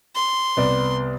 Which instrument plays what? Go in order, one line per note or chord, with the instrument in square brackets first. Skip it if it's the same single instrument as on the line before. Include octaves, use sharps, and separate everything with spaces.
[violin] C6
[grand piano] C2 B3 D5